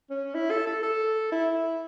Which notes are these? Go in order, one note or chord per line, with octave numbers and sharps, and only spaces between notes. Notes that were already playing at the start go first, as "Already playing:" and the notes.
C#4
E4
A4
A4
A4
E4